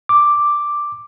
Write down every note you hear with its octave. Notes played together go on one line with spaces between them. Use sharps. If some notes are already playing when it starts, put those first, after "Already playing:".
D6